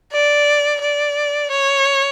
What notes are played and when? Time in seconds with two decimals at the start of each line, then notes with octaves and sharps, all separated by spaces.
0.12 D5
0.81 D5
1.51 C#5